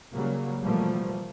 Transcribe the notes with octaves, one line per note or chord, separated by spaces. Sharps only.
C#3 F#3 G3 A#3
B2 E3 F3 G3 A3 A#3